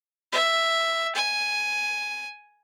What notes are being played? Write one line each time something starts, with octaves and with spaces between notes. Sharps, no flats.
E5
G#5